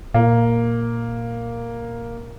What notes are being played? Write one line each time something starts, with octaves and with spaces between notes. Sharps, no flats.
A#2 A#3